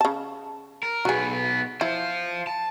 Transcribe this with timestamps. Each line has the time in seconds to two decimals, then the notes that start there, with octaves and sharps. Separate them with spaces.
0.01 C#3 A5
0.83 A#4
1.05 B1 B3 F#4 G#4
1.81 E4 F4 C5
2.47 A5